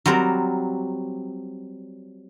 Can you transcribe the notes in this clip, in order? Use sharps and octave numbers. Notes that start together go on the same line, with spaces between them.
F#3 G3 C4 A#4